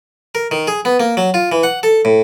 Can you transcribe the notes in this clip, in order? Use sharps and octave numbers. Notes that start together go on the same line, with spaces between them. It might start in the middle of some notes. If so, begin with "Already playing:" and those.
A#4
D#3
G#4
B3
A#3
F#3
F4
E3
F#5
A4
A2